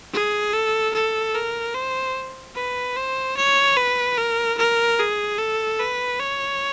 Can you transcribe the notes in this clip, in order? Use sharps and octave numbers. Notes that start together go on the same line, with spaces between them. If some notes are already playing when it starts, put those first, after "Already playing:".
G#4
A4
A4
A#4
C5
B4
C5
C#5
B4
A#4
A#4
G#4
A4
B4
C#5